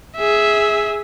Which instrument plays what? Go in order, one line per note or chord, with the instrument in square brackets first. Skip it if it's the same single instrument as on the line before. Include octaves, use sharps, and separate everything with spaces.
[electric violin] G#4 E5